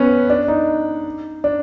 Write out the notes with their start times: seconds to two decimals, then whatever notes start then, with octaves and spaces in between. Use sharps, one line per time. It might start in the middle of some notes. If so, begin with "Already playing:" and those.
Already playing: B3 C#4
0.30 D4
0.48 D#4
1.44 D4